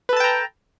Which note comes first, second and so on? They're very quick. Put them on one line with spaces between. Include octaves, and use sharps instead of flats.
B4 A4 A5 G5 A#5